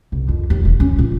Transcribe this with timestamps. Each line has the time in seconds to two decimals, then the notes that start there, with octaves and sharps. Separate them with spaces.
0.12 C2
0.28 F2
0.50 D#2
0.65 E1
0.80 C#4
0.99 A#2